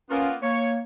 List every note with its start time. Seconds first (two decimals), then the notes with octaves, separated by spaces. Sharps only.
0.10 A#3 B3 C#4 F4
0.43 A#3 C#5